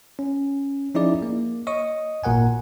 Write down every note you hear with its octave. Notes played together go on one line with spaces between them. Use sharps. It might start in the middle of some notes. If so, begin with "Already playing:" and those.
C#4
F3 C#4 D#4 E4 G#4 D5
A#3
C#5 D#5 C#6 D#6
G#1 A#2 A#4 F#5 G#5